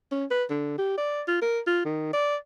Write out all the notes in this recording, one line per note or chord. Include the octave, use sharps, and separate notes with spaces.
C#4
B4
D3
G4
D5
F4
A#4
F4
D#3
D5